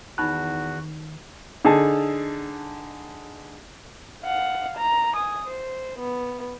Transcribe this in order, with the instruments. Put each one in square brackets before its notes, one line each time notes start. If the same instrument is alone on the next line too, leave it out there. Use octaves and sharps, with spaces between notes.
[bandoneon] E2 F#4 [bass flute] D#3 [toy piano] D#4 A5 B5 [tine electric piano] F#6
[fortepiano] D3 D#4 G#4 A5
[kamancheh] F5 F#5
A#5
G#5 D#6
C5
B3